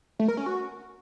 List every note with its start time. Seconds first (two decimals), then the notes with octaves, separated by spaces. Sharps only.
0.19 A3
0.28 A#4
0.37 C#4
0.46 F#4